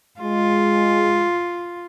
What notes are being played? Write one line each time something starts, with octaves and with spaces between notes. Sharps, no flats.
G#3 F4